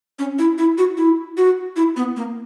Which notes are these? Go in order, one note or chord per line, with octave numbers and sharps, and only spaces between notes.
C#4
E4
E4
F#4
E4
F#4
E4
B3
A#3